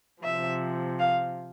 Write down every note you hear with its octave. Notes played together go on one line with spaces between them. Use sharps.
C3 F3 E5
F5